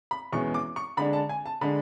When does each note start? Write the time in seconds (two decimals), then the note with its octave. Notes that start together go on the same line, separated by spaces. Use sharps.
0.11 B5
0.33 E2 B2 G#3 C#4 C#6
0.54 D6
0.76 C#6
0.97 D3 G#3 D4 B5
1.13 A5
1.29 G#5
1.46 A5
1.61 D3 G#3 D4 B5